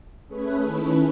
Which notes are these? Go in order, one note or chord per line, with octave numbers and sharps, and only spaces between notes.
A3 C#4 G#4 B4
D#3 A3 C#4 E4 B4